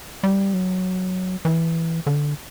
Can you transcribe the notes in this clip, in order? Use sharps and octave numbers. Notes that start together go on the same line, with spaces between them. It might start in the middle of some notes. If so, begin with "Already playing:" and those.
G3
F#3
E3
D3